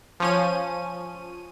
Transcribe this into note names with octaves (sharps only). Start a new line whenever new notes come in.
F3 C#4 D#7